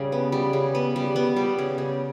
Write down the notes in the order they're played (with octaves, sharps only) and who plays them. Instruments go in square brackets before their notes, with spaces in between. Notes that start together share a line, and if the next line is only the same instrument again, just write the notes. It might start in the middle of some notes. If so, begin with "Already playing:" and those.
Already playing: [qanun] C#3 G3
B3
G3
C#3
B3
G3
B3
G3
C#3
C#3